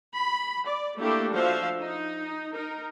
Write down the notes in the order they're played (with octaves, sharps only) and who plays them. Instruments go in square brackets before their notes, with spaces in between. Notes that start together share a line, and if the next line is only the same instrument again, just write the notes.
[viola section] B5
D5
A3 A#3 D4 E4 G4 A4
F3 F#4 C5 E5 F5
D#4
D#4 A#4